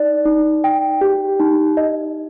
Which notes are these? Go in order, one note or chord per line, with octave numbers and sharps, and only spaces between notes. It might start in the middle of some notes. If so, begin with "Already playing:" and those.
Already playing: D#4 D5
D#4
G5
G4
D#4
D#5